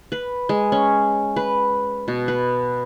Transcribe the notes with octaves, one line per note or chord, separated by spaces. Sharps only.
B4
G#3
C#4
B4
B2
B4